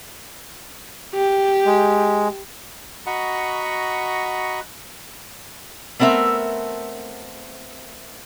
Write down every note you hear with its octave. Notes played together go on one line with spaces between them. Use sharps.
G4
G#3
F#4 D#5 F#5 A#5 B5 C#6
A3 B3 C4 A#4 E5